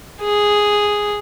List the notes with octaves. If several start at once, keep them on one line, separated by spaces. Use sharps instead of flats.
G#4